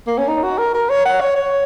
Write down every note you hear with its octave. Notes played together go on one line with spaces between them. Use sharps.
A#3
C#4
D#4
F#4
A#4
A#4
C#5
F#5
C#5
C#5